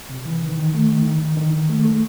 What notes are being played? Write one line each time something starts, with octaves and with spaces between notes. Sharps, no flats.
C3
E3
D#3
D#3
A3
D#3
D#3
D#3
D#3
D#3
A3
A3